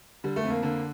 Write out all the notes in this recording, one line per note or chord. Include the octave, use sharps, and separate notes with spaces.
D3 G3
A3
F2
A#3
D3 A#3